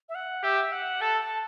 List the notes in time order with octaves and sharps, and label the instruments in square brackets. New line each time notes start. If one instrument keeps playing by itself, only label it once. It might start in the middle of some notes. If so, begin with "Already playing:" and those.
[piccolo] E5
F#5
[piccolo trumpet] G4 [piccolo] E5
[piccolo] F#5
[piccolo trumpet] A4 [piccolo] A5
[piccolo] A5